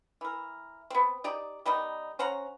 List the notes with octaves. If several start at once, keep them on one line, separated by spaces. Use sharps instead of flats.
E3 A#4
B3 C4
D#4 G4 D5
D#3 G3 B3 D#4
C#4 C5 F#5 A#5